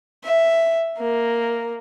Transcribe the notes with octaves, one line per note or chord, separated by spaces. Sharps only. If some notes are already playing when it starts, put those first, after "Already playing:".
E5
A#3